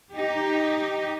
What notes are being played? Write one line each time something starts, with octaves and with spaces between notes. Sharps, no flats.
D#4 G4